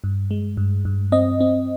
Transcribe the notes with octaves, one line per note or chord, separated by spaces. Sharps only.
G2
G#3
G2
G2
C4 D#5
C4